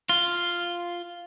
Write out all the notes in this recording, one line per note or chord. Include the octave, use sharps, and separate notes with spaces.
F4